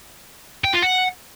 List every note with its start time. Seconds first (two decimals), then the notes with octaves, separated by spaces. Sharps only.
0.64 G5
0.74 F4
0.83 F#5